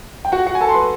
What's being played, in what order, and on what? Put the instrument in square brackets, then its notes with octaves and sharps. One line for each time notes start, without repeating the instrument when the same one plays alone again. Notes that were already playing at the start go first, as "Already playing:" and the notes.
[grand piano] G5
F#4 F#5
F#4 F#5
G#5
A4 A5
C6
B4 B5